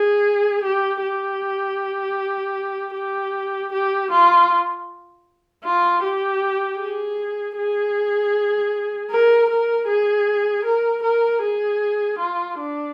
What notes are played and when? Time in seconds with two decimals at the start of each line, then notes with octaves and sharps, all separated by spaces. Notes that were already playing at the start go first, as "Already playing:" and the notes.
Already playing: G#4
0.64 G4
1.02 G4
2.95 G4
3.73 G4
4.11 F4
5.64 F4
6.04 G4
6.80 G#4
7.58 G#4
9.11 A#4
9.50 A#4
9.87 G#4
10.65 A#4
11.03 A#4
11.43 G#4
12.19 F4
12.58 D4